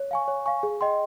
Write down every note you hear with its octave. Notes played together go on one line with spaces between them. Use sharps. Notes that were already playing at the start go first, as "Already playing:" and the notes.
Already playing: C#5
F5 G#5 C#6
C#5
F5 G#5 C#6
G#4
D#5 G5 C6